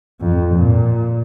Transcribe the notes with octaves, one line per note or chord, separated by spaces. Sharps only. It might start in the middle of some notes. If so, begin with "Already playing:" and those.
F2
A#2